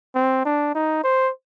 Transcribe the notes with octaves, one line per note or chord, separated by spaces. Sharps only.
C4
D4
D#4
C5